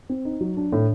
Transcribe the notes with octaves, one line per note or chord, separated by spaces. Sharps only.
C4
D#4
F#3
D4
A2